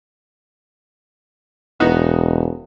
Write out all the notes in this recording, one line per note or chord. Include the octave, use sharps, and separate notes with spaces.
E1 B3 D#4 F#4